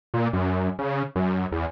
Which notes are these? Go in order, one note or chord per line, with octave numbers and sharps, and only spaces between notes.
A#2
F#2
C#3
F#2
E2